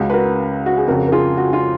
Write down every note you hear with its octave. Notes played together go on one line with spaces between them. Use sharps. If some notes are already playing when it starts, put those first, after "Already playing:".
Already playing: C#2 C#3 F#4
B4
F#4 A#4
F#4
G#4
F2 C#3 F#4 A#4
A#4
F4 G#4
F#4
F4